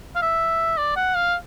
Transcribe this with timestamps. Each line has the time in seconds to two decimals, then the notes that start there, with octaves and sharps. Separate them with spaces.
0.16 F5
0.22 E5
0.77 D5
0.96 F#5
1.15 F5